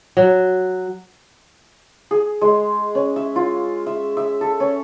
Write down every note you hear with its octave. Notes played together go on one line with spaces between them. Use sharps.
F#3
G#4
G#3
C#4
E5
F4
E5
E5
A4
C#4